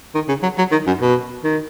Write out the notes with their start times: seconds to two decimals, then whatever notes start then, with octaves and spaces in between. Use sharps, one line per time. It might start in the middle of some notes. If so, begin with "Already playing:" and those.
0.15 D#3
0.28 C#3
0.43 F#3
0.58 F#3
0.71 D#3
0.87 F#2
1.01 B2
1.44 D#3